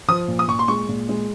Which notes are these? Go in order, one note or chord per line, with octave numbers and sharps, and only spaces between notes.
F3 D#6
A#2
D#6
A#2 C#6
C6
G#3 C#6
A#2
G#3